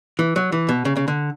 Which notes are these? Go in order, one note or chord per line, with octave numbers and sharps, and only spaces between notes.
E3
F#3
E3
B2
C#3
C#3
D3